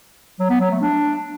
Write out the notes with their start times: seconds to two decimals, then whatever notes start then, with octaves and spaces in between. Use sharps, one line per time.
0.39 F#3
0.50 B3
0.60 F#3
0.71 A3
0.81 D4